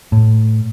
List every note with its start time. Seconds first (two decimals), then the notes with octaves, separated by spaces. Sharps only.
0.12 A2